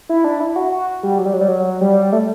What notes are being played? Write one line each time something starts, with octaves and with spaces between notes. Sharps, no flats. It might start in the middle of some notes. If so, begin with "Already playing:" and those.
E4
D4
E4
F#4
F#4
G3
F#3
G3
F#3
G3
F#3
G3
A3